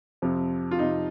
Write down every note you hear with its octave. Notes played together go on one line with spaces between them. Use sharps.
F2 C3 F3
F4
F2 C3 F3 D#4